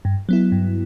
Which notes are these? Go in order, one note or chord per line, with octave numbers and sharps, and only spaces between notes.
G2
F#3 B3 E4
G2